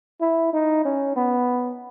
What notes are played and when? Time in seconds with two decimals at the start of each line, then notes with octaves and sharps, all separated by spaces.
0.21 E4
0.53 D#4
0.85 C#4
1.16 B3